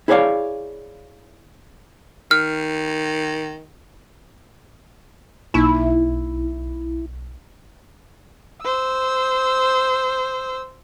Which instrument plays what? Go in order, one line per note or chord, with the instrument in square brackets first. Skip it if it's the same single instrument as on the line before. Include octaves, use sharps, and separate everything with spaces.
[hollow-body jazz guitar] E4 G#4 B4 C#5 D5 F5
[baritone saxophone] D#3 [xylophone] F6
[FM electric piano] B1 [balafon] A#3 D#4 [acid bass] E4
[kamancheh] C5 E6